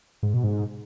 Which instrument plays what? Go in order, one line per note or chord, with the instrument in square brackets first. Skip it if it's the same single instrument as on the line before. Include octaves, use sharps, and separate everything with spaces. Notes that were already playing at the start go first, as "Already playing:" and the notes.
[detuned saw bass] G#2
B2
G#2